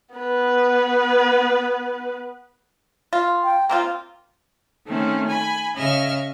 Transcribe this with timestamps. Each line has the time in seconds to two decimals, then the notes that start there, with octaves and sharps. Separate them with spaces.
0.15 B3 B4
3.13 F4
3.44 G5
3.69 A#3 C4 F4 G5
4.86 D#3 A3 C4 C#4
5.27 G#5 B5
5.74 C#3 D#5 E5 F6